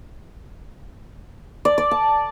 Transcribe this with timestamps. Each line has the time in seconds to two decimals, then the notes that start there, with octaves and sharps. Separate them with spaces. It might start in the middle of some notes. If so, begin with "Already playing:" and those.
1.65 D5
1.78 D5
1.91 A5